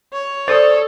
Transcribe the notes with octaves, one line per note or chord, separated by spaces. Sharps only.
C#5
A4 C5 D5 D#6